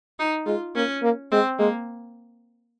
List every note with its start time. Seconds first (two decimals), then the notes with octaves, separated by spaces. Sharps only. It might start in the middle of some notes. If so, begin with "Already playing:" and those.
0.19 D#4
0.46 G#3 F4
0.75 A#3 C#4
1.03 A#3
1.31 G#3 C4
1.59 G#3 A#3